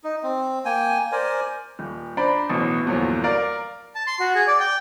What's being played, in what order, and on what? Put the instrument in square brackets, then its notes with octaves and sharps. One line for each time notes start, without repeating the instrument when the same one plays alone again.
[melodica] D#4
C4
A#3 G5 G#5
A#4 C5 D5 G#5
[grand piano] D#1
D4 C5 D5 A#5 B5
A1 B2 F#3
G1 E2 A#2 F3 F#3
A#4 D5 F5
[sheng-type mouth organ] A5
C6
F#4
G#4
D5
G5